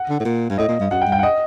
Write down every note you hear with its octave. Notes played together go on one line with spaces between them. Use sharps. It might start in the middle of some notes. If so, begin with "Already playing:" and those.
Already playing: F#5
D3
A2
A#2
G2
A2 D#5
A#2
G2
F#2 F#5
G5
G2
G5
F#5
D#5